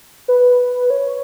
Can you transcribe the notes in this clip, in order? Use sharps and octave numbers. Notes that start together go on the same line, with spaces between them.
B4
C#5